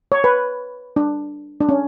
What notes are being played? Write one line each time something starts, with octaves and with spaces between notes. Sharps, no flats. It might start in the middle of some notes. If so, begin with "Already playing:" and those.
C#5
B4
D4
D4
C#4